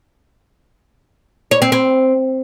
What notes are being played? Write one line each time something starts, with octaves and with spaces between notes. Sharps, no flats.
C#5
C4
C4